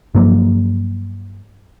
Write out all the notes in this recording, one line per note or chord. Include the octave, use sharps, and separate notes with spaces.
G2 F3 F#3 A#3